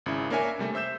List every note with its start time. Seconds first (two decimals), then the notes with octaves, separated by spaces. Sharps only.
0.06 G#1 C#3 C#4 E4
0.30 A#3 D4 A#4 C#5 E5 G#5
0.59 C3 G3 A3
0.74 C5 E5 E6 G6 E7